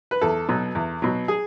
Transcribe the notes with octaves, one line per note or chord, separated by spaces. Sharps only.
B4
E2 A4
B2 F#3
E2
B2 F#3
G#4